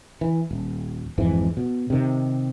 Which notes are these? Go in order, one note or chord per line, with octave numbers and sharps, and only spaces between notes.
E3
D#1
G#1 F2 G#2 E3
B2
C3 D#3